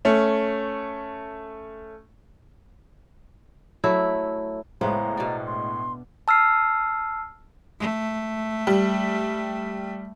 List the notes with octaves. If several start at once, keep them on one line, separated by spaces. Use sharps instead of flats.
A3 C#4
F#3 A3 E4
A2 C#3 G#3 B3 C5 A#5
B2 D4
C6
A5 E6 F6 C7
A3
G3